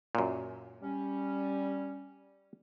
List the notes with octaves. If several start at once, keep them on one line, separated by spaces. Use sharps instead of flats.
F#2 A#2
G3 C#4